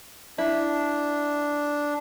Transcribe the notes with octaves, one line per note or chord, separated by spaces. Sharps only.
D4 E4